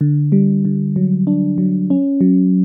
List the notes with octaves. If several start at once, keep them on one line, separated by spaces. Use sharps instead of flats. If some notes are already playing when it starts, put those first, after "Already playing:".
D3
G3
D3
F#3
D4
F#3
C#4
F#3